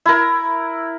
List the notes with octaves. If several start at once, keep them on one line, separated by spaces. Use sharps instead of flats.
E4 A#4